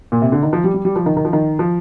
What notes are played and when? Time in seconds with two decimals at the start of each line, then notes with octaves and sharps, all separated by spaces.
0.12 A#2
0.22 C3
0.32 D3
0.43 D#3
0.53 F3
0.64 G3
0.74 G3
0.85 G3
0.96 F3
1.06 D#3
1.17 D#3
1.25 F3
1.33 D#3
1.59 F3